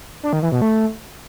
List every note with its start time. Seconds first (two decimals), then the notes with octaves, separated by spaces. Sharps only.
0.23 D4
0.33 D#3
0.42 E3
0.52 B2
0.62 A3